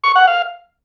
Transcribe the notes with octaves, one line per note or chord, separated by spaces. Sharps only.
C#6
F#5
F5